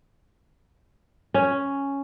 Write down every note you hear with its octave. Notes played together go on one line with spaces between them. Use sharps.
C#4